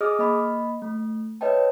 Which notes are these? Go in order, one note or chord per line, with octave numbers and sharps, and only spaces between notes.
G#4 D#5 D6 D#6 F6
A#3 D#5 B5
A3
B4 C#5 D#5 E5 G5 A5